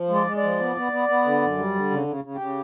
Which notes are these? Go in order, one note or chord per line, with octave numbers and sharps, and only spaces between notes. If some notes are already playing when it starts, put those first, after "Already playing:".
Already playing: F3
G#3
D5
G#3
D5
F3
B3
B3
B3
B3
D3
F#2
G3
D3
C#3
C#3
C#3
G4
C#3